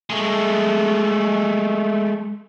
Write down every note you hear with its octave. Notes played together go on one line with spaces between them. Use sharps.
G#3 A3